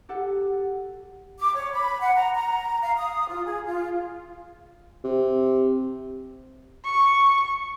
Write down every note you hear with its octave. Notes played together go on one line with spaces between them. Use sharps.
G4 A4 F#5
D6
C#5
B5
F#5
A#5
A#5
F5
D#6
F4
G#4
F4
C3
C#6